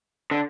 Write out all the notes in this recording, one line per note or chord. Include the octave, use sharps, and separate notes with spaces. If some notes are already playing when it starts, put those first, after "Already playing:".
D3